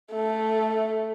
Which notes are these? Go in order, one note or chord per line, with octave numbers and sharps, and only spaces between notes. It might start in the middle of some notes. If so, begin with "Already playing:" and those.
A3